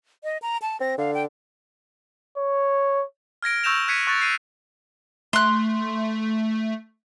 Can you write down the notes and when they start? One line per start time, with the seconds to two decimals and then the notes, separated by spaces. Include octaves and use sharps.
0.24 D#5
0.42 A#5
0.62 A5
0.81 C4 A#6
0.98 D3 F5
1.14 G5
2.38 C#5
3.43 F6 G#6 A#6 D7
3.64 C#6 E6 G6 A#6 E7 F7
3.88 F#6 G#6 B6 C#7 D#7
4.07 C#6 F#6 A6
4.21 C7 D#7
5.33 A3 C6 F#6